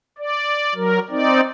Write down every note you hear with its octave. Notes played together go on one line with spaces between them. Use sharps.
D5
F#3 A#4
C4 D#4 D5